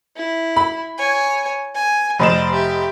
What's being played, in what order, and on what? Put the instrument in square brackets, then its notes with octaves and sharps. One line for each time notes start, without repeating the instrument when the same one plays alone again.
[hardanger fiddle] E4
[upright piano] B5
[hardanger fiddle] C#5 G#5
G#5
[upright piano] F1 D#5 E7 [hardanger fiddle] C5 D5
[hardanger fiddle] G4 E5